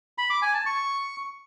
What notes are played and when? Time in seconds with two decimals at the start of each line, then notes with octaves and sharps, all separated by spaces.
0.18 B5
0.30 D6
0.42 G#5
0.54 A5
0.66 C#6